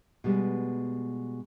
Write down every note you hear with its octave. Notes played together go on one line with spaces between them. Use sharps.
B2 G3 G#3